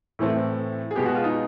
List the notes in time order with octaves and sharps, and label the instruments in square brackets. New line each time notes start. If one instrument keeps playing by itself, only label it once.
[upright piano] A2 E3 A3 C4
G#4
B2 G#3 B3 G4
F#4
F4
D#4